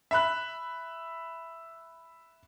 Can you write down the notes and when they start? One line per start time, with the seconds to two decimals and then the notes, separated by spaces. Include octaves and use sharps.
0.11 E5 B5 F#6